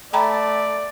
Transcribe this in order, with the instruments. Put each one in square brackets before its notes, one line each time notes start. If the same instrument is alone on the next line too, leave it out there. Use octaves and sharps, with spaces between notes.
[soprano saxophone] A3 [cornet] D5 [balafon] G5 A#5 B5